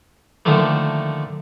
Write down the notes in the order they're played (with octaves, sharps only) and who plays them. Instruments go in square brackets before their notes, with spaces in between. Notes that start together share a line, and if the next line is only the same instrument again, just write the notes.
[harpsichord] D3 D#3 F3 A3 A#3